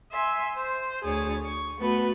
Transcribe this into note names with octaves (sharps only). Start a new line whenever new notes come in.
E5 G#5 C6
C5
D2 G#4 C#5 A6
C#6
A3 B3 F#4 B4